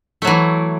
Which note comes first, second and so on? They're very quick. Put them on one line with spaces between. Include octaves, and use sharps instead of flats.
A3 F#3 E3